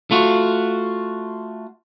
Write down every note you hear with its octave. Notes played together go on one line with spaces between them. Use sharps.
A3 F4 F#4